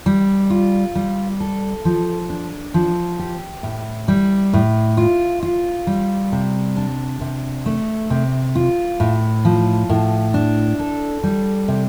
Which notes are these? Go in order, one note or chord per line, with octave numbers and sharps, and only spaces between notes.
G3
F4
G3
A4
F3
D4
F3
G4
A2
G3
A2
F4
F4
G3
C3
D4
C3
A3
C3
F4
A2
F3
A2
D4
A4
G3
C3